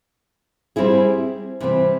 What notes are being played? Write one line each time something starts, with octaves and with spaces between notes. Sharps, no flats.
G3 C4 E4 G#4
C3 E3 G3 C4